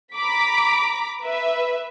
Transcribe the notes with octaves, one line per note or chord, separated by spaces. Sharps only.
A#5 B5 D6 B6
B4 E5